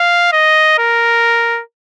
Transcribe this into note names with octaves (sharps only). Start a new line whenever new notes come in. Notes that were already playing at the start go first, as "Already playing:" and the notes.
Already playing: F5
D#5
A#4